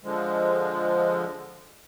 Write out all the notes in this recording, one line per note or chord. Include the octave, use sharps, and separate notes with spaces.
D3 F3 G#3